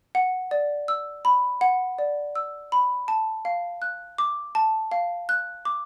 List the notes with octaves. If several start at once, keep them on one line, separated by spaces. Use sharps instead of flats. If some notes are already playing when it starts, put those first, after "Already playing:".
F#5
D5
E6
B5
F#5
D5
E6
B5
A5
F5
F#6
D6
A5
F5
F#6
D6